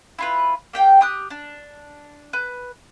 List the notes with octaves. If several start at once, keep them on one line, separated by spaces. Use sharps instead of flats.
E4 F4 B4
A#3 G4 G5
G4 D#6 F#6
D4
B4